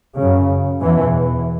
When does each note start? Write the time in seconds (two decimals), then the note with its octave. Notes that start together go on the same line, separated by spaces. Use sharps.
0.16 F#2 C#3
0.81 E2 B2 E3